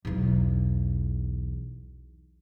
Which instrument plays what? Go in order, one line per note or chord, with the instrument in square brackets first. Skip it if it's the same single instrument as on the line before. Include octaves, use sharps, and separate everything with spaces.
[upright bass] B1 E2